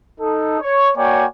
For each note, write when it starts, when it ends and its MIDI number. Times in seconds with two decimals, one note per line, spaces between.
0.21 0.57 63
0.21 0.57 69
0.60 0.90 73
0.97 1.26 58
0.97 1.26 66
0.97 1.26 73
0.97 1.26 74
0.97 1.26 79
0.97 1.26 80